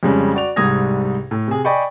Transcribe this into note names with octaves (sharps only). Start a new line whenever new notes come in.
F2 C#3 G3 G#3 C#4
F#4 D5 F7
C2 G#2 G3 D#6 G#6 A#6
A2
C3 G#4
D5 D#5 G5 G#5 B5 C#6